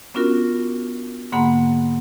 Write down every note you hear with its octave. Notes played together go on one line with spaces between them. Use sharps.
B3 C#4 D4 F4 F#4 A#4
G#2 D3 A#3 F#5 B5